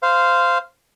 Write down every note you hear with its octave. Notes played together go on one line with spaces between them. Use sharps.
C5 F5